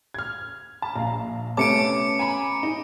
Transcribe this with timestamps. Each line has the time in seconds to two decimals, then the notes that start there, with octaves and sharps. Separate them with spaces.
0.14 F6 G#6
0.82 A5 B5
0.96 A#1 F5 A#5
1.57 C3 A3 B3 C#4 A5 D6 C#7 D7
2.19 G#5 A#5 B5
2.63 D#4